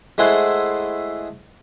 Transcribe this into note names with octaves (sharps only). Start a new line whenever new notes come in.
G#3 A3 E4 G#4 C5 F#5